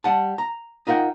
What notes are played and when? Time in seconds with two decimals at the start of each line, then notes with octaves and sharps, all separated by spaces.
0.04 G3 F#5 A5
0.38 A#5
0.87 D#4 F4 A#4 F#5 G5